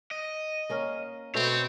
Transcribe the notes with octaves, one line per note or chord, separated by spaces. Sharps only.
D#5
A#3 C#4 A#4
B2 A3 B3 C4 C#5